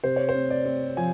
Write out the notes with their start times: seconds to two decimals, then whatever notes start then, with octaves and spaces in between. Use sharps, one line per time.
0.04 C3 C5
0.16 C#5
0.29 C5
0.35 C4
0.50 D5
0.65 C4
0.97 F3 G#5